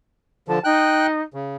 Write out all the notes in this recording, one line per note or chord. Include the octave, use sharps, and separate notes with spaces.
D3 F3 A5
D#4 G5 F#6
C#3